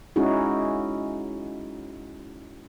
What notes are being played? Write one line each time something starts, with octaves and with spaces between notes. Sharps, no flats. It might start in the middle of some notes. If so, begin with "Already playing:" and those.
G#3 C#4 D#4 E4 F#4 G#4